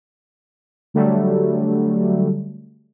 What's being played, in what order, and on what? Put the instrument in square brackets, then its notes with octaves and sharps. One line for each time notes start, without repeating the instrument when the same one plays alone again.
[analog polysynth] D3 F#3 G3 A3